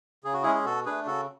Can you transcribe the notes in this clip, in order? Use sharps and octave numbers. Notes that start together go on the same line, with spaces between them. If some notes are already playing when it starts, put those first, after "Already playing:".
C#3 G#4
F#4
G#3 C#4 E4 G#4
G#4
B2 F#4 A4
A3 D4 G#4 B4
C#3 F#4 A4